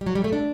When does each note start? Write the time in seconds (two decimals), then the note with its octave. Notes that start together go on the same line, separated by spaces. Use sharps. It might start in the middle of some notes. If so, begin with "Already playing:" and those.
0.01 G3
0.06 F#3
0.15 G3
0.24 A3
0.33 D4